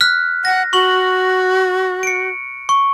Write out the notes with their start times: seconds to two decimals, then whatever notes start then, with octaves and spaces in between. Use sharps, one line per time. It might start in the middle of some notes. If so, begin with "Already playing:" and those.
0.01 F6 F#6 B6
0.45 F#5 A#6
0.73 F#4 C#6 F#7
2.03 C#7 D7
2.69 C#6